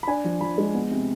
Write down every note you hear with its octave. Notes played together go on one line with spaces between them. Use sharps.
B5
D4 G#5
F3
F3 B5
G#3
B3
C3